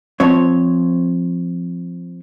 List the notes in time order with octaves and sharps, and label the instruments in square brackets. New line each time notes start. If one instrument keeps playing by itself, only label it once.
[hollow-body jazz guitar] F3 C4 C#5